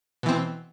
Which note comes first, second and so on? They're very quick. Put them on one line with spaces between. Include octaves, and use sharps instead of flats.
B2 E3 C4